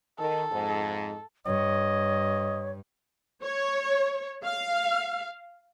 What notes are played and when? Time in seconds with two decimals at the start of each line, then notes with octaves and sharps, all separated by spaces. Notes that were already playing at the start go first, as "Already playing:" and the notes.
0.19 D#3 A4
0.51 F2 G#2
1.46 G2 C#5 D#5
3.42 C#5
4.43 F5